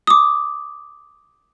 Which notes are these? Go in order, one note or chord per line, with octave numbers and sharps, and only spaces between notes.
D6 D#6